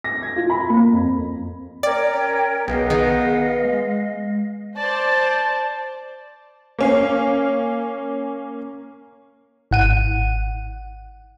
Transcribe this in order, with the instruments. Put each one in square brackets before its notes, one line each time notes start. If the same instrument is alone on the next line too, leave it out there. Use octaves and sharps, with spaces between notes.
[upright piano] A#6
G#6
F4
B5
A#3
F2
[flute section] C#4 A#4 G5 [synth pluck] D5
[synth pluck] B1 [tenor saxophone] B3 [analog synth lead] G#4 [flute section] D#5 F5
[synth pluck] D#3
[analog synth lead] G#3
[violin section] C5 D5 A5
[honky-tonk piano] A#3 C#4 F5
[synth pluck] G#1 F#5 D#7